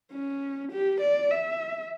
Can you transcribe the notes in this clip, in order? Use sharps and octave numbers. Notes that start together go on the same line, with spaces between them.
C#4
G4
D5
E5